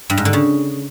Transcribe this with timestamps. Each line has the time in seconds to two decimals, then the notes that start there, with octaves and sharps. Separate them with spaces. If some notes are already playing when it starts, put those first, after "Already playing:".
0.10 G2
0.17 G#2
0.25 D3
0.33 C#3